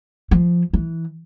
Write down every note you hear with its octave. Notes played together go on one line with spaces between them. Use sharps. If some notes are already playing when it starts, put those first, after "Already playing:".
F3
E3